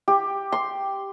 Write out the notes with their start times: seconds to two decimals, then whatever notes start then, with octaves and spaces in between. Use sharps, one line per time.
0.08 G4
0.52 C6